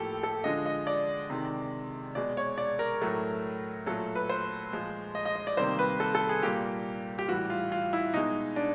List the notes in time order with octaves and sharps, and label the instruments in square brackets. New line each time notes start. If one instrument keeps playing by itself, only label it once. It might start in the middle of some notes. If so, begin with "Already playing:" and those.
Already playing: [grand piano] A2 F3 A#3 G4 A4
A4
D3 F3 G#3 D#5
D#5
D5
C3 D#3 G#3
B2 G#3 D5
C#5
D5
A#4
A2 F#3 A3
A#2 F#3 A3 A4
B4
C5
A#2 F3 G#3
D#5
D#5
D#5
D5
C3 D#3 G3 A#3 C5
B4
A4
A4
G#4
A#2 G3 A#3 G4
G4
A2 E3 G3 F#4
F4
F4
E4
B2 G#3 D#4
D4